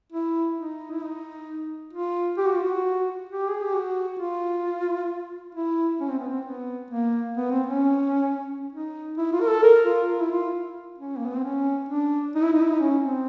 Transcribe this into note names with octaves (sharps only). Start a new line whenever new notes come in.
E4
D#4
E4
D#4
F4
G4
F#4
F4
F#4
G4
G#4
G4
F#4
F4
E4
C#4
C4
B3
C4
B3
A#3
B3
C4
C#4
D#4
E4
F4
A#4
A4
A#4
F4
F4
E4
F4
C#4
A#3
B3
C4
C#4
D4
D#4
E4
D#4
E4
D#4
C#4
C4